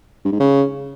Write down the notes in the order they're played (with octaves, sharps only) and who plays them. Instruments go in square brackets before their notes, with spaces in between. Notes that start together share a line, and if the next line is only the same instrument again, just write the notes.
[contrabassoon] G2
G#2
C#3